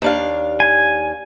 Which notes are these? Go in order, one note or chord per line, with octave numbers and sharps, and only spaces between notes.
D#2 D4 F5
G#5